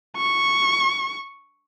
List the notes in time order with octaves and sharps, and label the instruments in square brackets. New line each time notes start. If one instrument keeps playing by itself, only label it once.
[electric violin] C#6